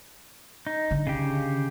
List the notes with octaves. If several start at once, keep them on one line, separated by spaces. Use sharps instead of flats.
D#4
D3
C#3 G4